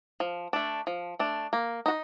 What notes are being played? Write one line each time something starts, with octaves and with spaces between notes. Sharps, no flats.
F3
A3 D4
F3
A3 D4
A#3
D#4 F#4